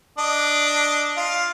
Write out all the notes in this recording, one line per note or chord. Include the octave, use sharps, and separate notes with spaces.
D4 D#5
F4 F5